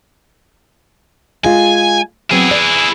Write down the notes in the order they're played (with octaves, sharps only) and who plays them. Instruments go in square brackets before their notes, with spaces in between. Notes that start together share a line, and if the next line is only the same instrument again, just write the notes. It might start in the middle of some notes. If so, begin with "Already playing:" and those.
[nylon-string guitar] G#3 F4 [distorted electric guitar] G#5
[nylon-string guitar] F#3 B3 C4 [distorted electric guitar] E4 G#4
[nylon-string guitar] D5